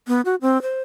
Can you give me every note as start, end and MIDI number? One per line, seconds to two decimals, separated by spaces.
0.08 0.21 59
0.25 0.35 66
0.42 0.61 60
0.62 0.82 72